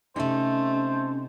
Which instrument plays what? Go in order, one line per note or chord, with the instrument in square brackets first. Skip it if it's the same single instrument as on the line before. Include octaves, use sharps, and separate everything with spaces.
[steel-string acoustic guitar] C3 D#4 [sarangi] A3 [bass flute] C#4 [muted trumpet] C5